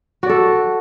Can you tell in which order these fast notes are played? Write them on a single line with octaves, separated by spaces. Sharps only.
F#4 D5 A4